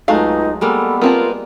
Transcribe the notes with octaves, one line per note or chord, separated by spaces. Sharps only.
C#2 F#3 G#3 A3 D#4 F5
G3 G#3 A#3 B3 A4
B3 C4 F4 A#4 A5